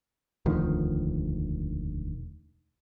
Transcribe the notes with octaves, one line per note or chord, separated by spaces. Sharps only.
E1 D2 D#3 F3